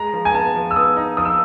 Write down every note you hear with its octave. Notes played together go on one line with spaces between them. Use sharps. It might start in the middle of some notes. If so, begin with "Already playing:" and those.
Already playing: G#3 A#5
F3
G#5
B3 A5
F3
E6
B3 D#6
D#4
F3 D#6
E6